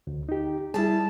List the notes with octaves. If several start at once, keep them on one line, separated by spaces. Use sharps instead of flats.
D2
D#4 G4
G3 E4 G#4 A5